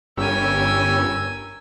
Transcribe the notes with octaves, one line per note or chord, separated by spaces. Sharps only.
G1 G3 C#4 A#4 G#5 E6